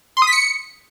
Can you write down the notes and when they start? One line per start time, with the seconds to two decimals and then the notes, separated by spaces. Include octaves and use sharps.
0.17 C6
0.22 D#6
0.27 B6
0.32 C#7